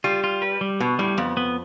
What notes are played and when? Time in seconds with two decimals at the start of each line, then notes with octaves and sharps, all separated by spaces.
0.04 G3 F4
0.24 F4
0.42 B4
0.61 G3
0.80 B2 B3
0.99 A2 G3
1.18 F2 B3
1.37 B3